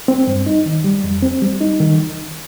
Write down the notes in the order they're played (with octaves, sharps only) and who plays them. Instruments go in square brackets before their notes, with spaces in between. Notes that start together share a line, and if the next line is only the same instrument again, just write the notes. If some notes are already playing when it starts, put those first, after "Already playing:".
[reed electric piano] C4
G2
D#4
D#3
G3
F2
C4
G3
D#4
D#3